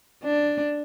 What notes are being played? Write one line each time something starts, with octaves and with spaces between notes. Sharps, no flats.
D4